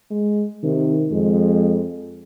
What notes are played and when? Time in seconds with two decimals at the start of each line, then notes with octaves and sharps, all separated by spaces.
0.11 G#3
0.63 C3 D#3
1.11 F2 G#3